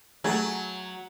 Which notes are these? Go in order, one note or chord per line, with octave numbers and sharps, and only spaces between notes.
F#3 A3 G#4 G#5